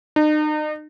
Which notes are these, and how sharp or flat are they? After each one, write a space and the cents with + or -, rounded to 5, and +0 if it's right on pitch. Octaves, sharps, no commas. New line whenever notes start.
D#4 -40